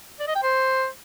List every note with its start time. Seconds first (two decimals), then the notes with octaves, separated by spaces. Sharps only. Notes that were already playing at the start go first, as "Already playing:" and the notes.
0.20 D5
0.28 D#5
0.35 G5
0.43 C5